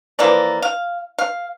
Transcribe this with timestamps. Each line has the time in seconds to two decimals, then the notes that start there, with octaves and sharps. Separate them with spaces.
0.19 E3 F3 A#3 D5
0.62 F5
1.19 F5